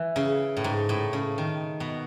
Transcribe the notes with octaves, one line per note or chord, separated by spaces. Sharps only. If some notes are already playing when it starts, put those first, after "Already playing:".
Already playing: E3
C#3
A2
G#2
A2
C#3
D#3
B2